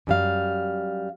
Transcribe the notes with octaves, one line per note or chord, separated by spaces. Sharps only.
F#2 G3 F5